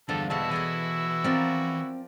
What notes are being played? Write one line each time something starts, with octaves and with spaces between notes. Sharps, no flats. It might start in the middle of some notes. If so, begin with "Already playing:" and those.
E2 D3 F3 G3 D4 A4
B2 G3 G#3 E4 F#4 A5 E6
E3 G#4 A4 D#5
F3 C4 A#4 D5